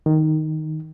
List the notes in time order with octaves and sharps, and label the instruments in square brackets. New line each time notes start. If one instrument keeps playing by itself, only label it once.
[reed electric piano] D#3